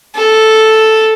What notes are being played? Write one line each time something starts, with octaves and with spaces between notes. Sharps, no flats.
A4